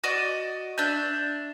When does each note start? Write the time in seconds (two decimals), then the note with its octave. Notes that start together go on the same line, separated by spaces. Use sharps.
0.04 F#4 D5 D#5
0.78 D4 E5 G6